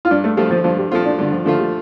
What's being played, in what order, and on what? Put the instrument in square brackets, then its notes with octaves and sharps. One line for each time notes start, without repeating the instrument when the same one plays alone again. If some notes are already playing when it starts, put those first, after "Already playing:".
[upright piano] F4
[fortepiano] G2 [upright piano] D4
[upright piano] A3
[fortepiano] F3 A3 F4 [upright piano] G3
[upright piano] F3
[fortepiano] G2 [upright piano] F3
[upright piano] G3
[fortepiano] F3 A3 F4 [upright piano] C4
[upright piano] D4
[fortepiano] G2 [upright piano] D3
[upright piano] F3
[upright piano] D3 [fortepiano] F3 A3 F4
[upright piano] G3